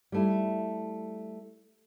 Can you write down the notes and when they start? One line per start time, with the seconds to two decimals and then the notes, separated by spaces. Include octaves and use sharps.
0.12 G3 A3 E4